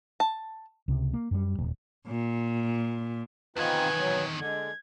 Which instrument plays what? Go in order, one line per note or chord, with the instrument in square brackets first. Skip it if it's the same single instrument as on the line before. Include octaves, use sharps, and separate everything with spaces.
[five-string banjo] A5
[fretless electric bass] C#2 C3
A#3
F#2 G3
D#1
[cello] A#2
[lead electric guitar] E2 D#3 [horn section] B3 B4 [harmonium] C4 D#4 F4 [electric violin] G#5
[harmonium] F#3
[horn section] D3 [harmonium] G#3 [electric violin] G#6